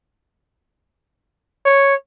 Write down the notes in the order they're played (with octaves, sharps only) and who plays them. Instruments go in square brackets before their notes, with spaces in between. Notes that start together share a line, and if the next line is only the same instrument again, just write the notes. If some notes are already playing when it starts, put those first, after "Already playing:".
[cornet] C#5